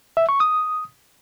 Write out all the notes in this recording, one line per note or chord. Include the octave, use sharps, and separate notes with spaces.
E5
C#6
D#6